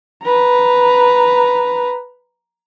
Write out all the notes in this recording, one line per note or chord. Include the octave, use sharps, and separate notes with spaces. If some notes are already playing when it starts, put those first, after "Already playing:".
B4 A#5